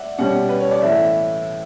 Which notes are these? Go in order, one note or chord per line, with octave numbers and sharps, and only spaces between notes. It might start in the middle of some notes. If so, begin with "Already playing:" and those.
Already playing: D5 E5 F#5
B2 G3 C#4 F#5
B4
C#5
D5
A2 E3 A3 E4 E5